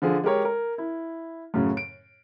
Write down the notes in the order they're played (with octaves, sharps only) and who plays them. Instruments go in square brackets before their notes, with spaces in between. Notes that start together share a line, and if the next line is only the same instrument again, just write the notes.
[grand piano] D3 F3 G#4
G#3 G4 A#4 C#5
A#4
E4
F#2 A2 C#3
D7